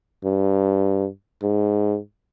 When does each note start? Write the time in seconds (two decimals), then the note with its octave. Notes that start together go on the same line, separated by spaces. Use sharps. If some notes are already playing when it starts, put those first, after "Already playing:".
0.24 G2
1.42 G#2